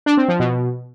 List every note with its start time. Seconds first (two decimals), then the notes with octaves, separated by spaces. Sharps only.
0.06 D4
0.17 C4
0.28 F3
0.40 B2